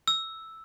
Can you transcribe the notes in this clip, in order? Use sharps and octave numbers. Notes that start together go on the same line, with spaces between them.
E6